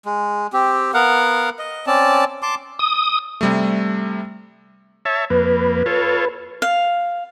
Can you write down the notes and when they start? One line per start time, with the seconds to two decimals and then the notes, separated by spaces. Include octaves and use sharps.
0.05 G#3
0.53 C4 G4
0.94 B3 A#4 F5 F#5
1.59 D#5
1.87 C4 C#4 D5 A5
2.42 A5 C6 D6
2.79 D#6
3.41 C3 G3 A3
5.05 C#5 E5 A5
5.30 F2 A#3 B4
5.86 F4 A4 C#5
6.62 F5